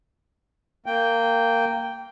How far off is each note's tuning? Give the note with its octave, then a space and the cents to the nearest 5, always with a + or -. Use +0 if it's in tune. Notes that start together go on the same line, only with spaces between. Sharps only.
A#3 -15 G5 +0